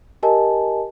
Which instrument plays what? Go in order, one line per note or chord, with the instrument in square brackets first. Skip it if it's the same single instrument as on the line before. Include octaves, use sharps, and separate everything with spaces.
[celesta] G4 A#4 D#5 G#5 A5